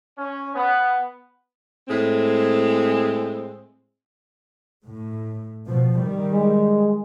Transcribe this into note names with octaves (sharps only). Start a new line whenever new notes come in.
C#4
B3
A2 G#3 C4
A2
B2 F3
D#3 G3
G#3